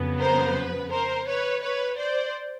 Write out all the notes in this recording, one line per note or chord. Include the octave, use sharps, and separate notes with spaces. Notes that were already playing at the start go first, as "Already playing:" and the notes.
Already playing: F2 C#3 F#3 B3
A#4 C5
B4
A#4 C5
B4 C#5
B4 C#5
C5 D5